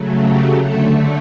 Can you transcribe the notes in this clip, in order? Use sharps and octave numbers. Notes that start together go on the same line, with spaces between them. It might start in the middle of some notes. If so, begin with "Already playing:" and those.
Already playing: C#3 F#3 A3
G4
D3 A3 A4